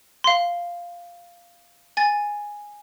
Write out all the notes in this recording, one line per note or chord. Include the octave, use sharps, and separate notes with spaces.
F5 C6
G#5 A6